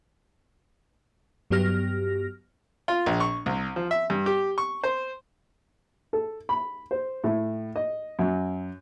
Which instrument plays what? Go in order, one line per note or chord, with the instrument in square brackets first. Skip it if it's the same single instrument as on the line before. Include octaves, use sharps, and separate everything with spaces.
[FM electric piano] G2 F#3 B3 G4 F6 A#6
[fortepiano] F4
A#1
C#6
C2
F3
E5
G2
G4
C#6
C5
A4
B5
C5
A2
D#5
F#2